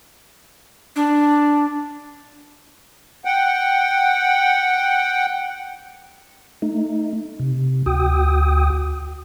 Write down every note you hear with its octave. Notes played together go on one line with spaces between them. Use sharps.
D4
F#5 G5
A3 D#4
C3
D2 F#4 G5 D#6